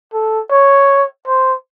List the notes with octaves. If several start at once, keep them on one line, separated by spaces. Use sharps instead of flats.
A4
C#5
C5